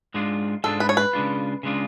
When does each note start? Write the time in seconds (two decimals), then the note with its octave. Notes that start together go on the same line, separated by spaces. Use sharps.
0.14 G#2 G#3 D4 F4
0.64 G#2 G#3 D4 F4 A4
0.80 B4
0.89 C#5
0.97 B4
1.13 C#3 G#3 D4 F4
1.63 C#3 G#3 D4 F4